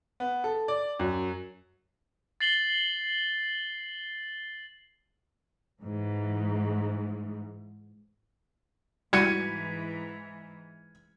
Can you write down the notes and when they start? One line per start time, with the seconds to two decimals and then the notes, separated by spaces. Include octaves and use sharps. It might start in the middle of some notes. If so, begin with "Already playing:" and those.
0.20 B3
0.44 A4
0.68 D5
1.00 F#2
2.41 A6 C7 F#7 G7
5.80 G#2 E3
9.13 G#2 E3 G3 E4 F#4 G#6 C#7 D#7